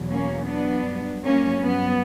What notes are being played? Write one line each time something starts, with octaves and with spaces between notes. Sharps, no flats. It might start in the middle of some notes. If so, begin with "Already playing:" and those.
Already playing: E2 B2 F#3
A#3 C#4
B3 D4
G2 F#3
A#3 C#4
B3